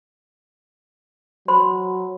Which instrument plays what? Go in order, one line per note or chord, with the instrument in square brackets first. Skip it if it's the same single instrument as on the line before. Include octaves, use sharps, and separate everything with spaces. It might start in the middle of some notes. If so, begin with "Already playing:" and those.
[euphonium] F#3 [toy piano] C5 B5 C6